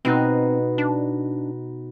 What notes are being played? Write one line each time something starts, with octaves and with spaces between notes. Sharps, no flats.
B2 C4 D#4 F#6
D4